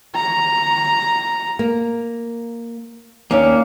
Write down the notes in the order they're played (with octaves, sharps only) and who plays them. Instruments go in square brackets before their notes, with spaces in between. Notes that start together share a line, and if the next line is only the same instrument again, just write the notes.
[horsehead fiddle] A#5
[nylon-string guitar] A#3
[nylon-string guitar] D#2 C#4 [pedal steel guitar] A#3 D4 F5